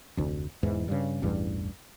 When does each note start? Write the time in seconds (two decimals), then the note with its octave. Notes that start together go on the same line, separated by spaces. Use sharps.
0.17 F1 D2
0.63 E1 E2 G#2 E3
0.88 G2 C#3
1.22 A1 E2 G2